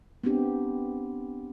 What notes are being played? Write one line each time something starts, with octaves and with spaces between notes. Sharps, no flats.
B3 C4 D4 G4